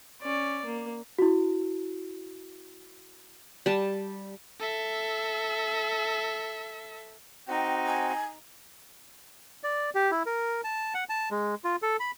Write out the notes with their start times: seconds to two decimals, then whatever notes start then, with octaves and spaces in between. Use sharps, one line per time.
0.22 C#4 D5
0.65 A#3
1.19 E4 F#4
3.66 G3 A5
4.60 A4 E5
7.48 C4 D#4 F#4 G5
7.86 G#5
9.64 D5
9.95 G4
10.11 E4
10.26 A#4
10.64 A5
10.94 F#5
11.09 A5
11.31 G#3
11.64 F4
11.82 A4
12.00 B5